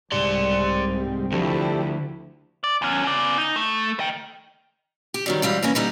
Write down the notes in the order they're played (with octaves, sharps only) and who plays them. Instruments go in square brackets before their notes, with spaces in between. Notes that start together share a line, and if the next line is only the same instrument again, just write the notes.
[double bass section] C2 C4 [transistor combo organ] G#2 G3 [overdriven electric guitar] D5 C6
[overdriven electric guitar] D2 [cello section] F3 E4 [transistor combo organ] D4 G4 A4
[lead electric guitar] D5
E2 C#4
C#3 D5
D#4
A3
D#5 G5
[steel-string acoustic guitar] G4
D#3 F#3 G3
G#2 E3 G3 F5
E3 A#3 C#4
D3 G3 D#4